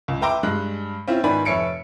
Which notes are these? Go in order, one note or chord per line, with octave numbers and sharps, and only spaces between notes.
C#2
B4 E5 G5 A#5 C6 D6
G2 G#3 F#6
C4 C#4 E4 F4 C5 E5
G#2 D#3 B3 D5 G#5 B5
F1 B4 C#5 E5 C#7 D7